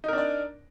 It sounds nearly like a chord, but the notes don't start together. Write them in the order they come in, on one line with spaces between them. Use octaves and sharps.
D#4 A#4 D4 D5